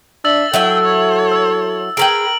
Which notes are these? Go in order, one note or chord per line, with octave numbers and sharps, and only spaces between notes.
D4 E5 E6 A6 F#7
F#3 E4 A4 E5 G5
C#5
E6
G#4 A#4 B4 G5 D7 F#7